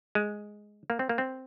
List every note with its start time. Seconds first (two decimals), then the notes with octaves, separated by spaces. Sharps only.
0.15 G#3
0.90 A#3
0.99 C4
1.09 A#3
1.18 C4